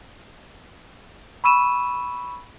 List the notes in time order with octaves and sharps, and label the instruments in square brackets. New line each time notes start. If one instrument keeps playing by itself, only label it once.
[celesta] B5 C#6 E6 D#7 E7